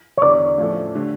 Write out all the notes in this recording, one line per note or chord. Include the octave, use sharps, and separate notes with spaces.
C#5
E2 D3 G3 D5
A2 F3 C#4 E4 A4
D3 A3 D4 G4